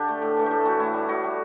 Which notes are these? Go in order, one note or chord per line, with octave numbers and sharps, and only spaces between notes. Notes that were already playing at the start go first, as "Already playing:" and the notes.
Already playing: D3 D4 G4 A4
A3
A2
E3 A3
A2 G4 A4
E3 A3 F#4
A2 E4
G3
A2 F#4
G3